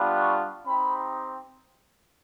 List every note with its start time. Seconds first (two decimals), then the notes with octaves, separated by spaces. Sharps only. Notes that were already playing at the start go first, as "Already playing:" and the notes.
Already playing: G3 B3 D4 F4
0.20 C#6
0.66 C4 D#4 G4 B5